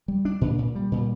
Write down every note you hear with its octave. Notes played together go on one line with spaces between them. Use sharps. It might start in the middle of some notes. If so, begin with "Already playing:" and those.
G3
D4
A#2
A#2
G3
A#2